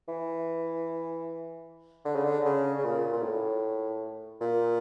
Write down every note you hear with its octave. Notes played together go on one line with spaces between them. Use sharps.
E3
D3
C#3
D3
C#3
C#3
A#2
A#2
A2
A#2